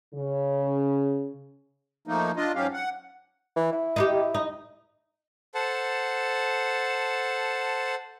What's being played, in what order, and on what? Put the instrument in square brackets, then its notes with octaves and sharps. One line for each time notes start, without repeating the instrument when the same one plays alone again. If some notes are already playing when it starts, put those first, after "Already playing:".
[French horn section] C#3
[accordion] F3 A3 A#3 D#4
D4 F4 D#5
G#2 F#3 C#4 G4 F5
F#5
[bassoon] E3
E4
[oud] D#4 F4 G4
D#4
[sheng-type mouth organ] A4 C5 F#5 A5